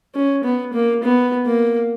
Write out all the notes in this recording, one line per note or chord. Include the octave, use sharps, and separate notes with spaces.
C#4
B3
A#3
B3
A#3